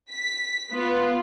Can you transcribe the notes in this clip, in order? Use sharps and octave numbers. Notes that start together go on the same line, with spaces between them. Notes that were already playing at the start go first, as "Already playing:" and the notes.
B6
B3 F4